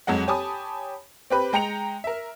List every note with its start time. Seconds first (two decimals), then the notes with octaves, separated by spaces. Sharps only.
0.07 F2 F#3 G#3 F#5
0.27 G4 C#5 G#5 A5 B5 D#6
1.30 C4 G4 B4 B5
1.53 G#3 G5 A#5 C#7 F7
2.04 A#4 E5